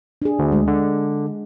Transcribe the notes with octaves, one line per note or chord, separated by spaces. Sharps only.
D4 G#4
D2
G#3
D3